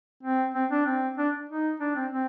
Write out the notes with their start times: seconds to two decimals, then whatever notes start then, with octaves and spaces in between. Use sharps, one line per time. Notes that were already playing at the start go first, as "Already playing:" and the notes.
0.23 C4
0.54 C4
0.71 D4
0.86 C4
1.18 D4
1.49 D#4
1.80 D4
1.96 C4
2.12 C4